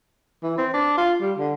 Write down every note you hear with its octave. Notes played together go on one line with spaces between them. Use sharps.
E3
C4
D4
F4
G3
D3